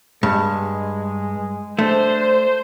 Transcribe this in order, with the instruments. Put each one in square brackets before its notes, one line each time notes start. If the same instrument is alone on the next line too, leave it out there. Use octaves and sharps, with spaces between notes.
[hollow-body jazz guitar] G2 [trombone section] G#3
[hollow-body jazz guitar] A3 [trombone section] D4 [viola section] C5